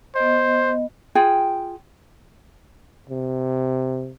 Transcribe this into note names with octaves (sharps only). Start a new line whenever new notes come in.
B3 C5 D#5
F4 G#4 G5
C3